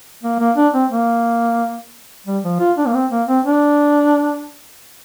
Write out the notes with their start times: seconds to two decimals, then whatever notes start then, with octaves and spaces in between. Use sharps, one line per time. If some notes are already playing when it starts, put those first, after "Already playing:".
0.23 A#3
0.39 A#3
0.57 D4
0.74 C4
0.91 A#3
2.27 G3
2.44 F3
2.60 F4
2.78 D4
2.87 A#3
2.94 C4
3.11 A#3
3.28 C4
3.45 D4